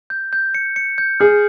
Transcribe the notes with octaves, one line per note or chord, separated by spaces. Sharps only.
G6
G6
C#7
C#7
G6
G#4 F6